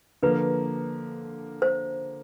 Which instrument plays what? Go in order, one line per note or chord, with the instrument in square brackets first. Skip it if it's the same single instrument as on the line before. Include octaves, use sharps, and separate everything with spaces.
[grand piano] D3 F3 A#3 [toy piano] B4
[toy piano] C5